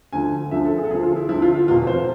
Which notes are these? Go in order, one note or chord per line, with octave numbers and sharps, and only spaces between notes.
D2 D3 F3 G#5
D2 D3 F3 E5
A4
G#4
A4
D2 D3 F3 G#4
F4
E4
D2 D3 F3 E4
F4
F4
F1 E2 B2 F4
C5